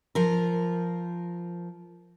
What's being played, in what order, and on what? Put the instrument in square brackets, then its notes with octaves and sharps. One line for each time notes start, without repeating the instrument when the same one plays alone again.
[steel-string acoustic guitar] F3 A#4